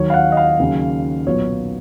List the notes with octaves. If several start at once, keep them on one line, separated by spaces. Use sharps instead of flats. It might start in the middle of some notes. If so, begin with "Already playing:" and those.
Already playing: D#2 D#3 F#3 C#5
F5
F#5
D#5
F5
D#2 C#3 F#3 C#4
B1 A#2 F#3 B3 C#5